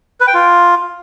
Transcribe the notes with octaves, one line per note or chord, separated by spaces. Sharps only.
B4
G5
F4